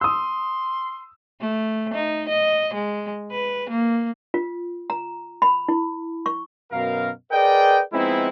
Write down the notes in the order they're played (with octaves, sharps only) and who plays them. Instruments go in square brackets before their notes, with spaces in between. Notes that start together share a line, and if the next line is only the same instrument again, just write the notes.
[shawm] C6 [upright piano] D#6 E6
[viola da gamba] A3
D#4
D#5
G#3
B4
A#3
[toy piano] F4
A#5
B5
E4
C#6
[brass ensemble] F#2 B2 A#4 F5
G#4 A#4 B4 D5 D#5 G5
F3 G#3 B3 C4 D#4 E4